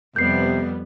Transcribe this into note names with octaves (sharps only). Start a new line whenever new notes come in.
F2 C3 G3 B3 G6 C7